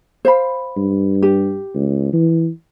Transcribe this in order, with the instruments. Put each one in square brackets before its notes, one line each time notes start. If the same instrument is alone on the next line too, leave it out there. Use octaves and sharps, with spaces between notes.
[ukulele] C5 F5 B5
[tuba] G2
[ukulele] G4
[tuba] C#2
E3